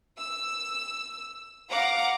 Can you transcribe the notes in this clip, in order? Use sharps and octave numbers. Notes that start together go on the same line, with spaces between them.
E6
F5 F#5 A#5 D6